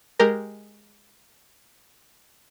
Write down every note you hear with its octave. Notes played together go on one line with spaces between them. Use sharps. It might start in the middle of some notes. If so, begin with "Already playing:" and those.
G#3 G4 A#4